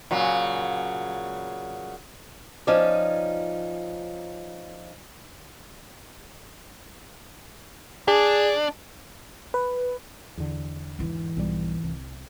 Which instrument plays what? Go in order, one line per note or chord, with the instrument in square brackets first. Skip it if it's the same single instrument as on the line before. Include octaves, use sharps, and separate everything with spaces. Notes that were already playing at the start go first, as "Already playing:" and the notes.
[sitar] A#2 C#3 F#3
[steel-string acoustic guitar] F3 C#4 D#4 D5
[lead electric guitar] D4 [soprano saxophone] G#4
[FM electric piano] B4
[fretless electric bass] E2 D3
[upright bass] G#2 E3
[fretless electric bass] B1 G3
C2